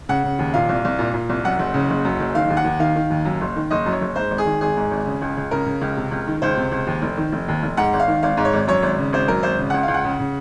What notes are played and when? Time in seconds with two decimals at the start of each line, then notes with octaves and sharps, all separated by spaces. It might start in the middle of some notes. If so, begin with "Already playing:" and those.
0.09 C#3 F#5
0.24 C#3
0.39 D#2
0.54 A#2 F5
0.69 C2
0.85 C2
0.99 A#2
1.14 A#2
1.29 C2
1.44 F#2 F#5
1.59 F#1
1.74 C#3
1.90 F#1
2.05 F#2
2.20 F#1
2.35 D#3 F5
2.50 D#2
2.57 F#5
2.64 D#2
2.79 D#3 F5
2.96 D#3
3.10 D#2
3.25 F#2
3.41 F#1
3.56 D#3
3.71 F#1 D#5
3.86 F#2
3.93 C#5
4.01 F#1
4.16 G#2 C5
4.31 G#1
4.38 G#4
4.46 D#3
4.61 G#1 G#4
4.77 G#2
4.91 G#1
5.06 C#3
5.21 C#2
5.37 C#2
5.51 C#3 A#4
5.66 C#3
5.81 C#2
5.97 C3
6.11 C#2
6.27 D#3
6.42 C#2 C5
6.57 C3
6.71 C#2
6.87 D#2
7.02 F1
7.18 D#3
7.32 F1
7.48 D#2
7.63 F1
7.77 G#2 F#5
7.93 G#1
8.00 F5
8.08 D#3
8.23 G#1 F5
8.37 G#2
8.45 C#5
8.53 G#1
8.67 F#2 C#5
8.83 G#1
8.98 C#3
9.13 G#1 C5
9.28 F#2 A#4
9.43 G#1 C5
9.59 C#3
9.70 C#2 F#5
9.83 C#2 F5
9.94 F#5
10.04 C#3
10.19 C#3